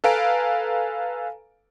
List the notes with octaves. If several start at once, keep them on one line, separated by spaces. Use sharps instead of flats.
A4 B4 F5 G#5 A#5 D7